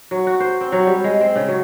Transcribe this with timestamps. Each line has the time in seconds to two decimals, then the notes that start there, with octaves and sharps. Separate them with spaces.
0.11 F#3
0.27 F#4
0.40 C5
0.61 C4
0.72 F#3
0.87 G3
1.04 G#3
1.21 C4
1.36 C#3
1.48 F#3